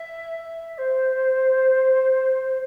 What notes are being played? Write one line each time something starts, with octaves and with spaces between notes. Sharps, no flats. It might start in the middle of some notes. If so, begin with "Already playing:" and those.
Already playing: E5
E5
C5